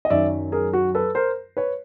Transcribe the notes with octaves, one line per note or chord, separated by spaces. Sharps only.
D#5
F#2 D#3 F#3 D5 E5
G#4 A#4
F#4
A4 B4
A#4 C5
B4 C#5